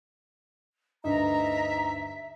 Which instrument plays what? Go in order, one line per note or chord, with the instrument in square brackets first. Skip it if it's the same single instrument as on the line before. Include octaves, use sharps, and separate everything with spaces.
[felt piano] D2 G2 [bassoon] D#4 [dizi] E5 [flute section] A#5